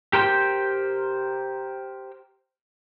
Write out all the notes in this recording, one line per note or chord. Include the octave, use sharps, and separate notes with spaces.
G4 A#4 C5 G5